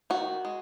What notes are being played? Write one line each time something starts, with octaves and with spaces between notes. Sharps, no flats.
D#3 F#4
G#3